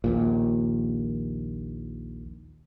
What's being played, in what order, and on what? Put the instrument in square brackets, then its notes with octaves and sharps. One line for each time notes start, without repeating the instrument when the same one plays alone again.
[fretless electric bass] A#1 D#2 A#2